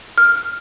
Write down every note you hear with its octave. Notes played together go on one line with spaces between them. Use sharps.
F6